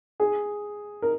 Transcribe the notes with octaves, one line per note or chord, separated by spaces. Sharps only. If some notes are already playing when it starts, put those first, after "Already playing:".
G#4
A#4